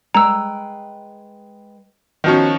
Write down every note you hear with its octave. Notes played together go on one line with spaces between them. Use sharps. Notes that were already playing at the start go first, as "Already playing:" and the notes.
G#3 B4 G5 A#5 E6
D#3 F3 B3 C#4 F#4